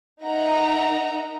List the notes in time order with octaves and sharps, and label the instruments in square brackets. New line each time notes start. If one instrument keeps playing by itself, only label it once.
[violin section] D#4 A#4 E5 F#5 A#5